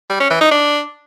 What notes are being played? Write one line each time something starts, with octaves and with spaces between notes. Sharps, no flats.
G3
C#4
E3
D#4
D4